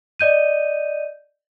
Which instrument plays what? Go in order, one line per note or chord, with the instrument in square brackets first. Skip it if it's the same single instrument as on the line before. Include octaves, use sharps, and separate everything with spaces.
[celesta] D5 D#5 G6 D#7